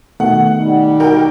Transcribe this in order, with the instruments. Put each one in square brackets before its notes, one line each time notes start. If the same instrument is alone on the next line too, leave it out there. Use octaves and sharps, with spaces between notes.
[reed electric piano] B2 D#3 A3 [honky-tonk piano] F#5
[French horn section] G3 D#4
[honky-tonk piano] F#4 A#4 G5